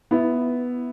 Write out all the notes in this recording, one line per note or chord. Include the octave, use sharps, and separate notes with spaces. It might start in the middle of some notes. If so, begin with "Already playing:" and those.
B3 E4